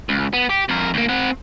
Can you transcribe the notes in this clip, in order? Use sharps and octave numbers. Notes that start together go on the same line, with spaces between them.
C#2
B3
G4
F2 A#4
D2 A#3
C4 F#5